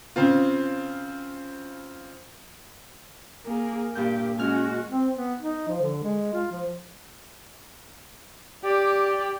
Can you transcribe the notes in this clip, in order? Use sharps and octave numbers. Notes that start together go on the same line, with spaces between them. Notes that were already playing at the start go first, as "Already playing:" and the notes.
C#3 C4 F4
A#3 G#4 A#4
G2 A#2 G4 G6
G#3 C#4 F#4 G#5 F6
C4
B3
D#4
F3
D3
G#3
F4
F3
G4 D5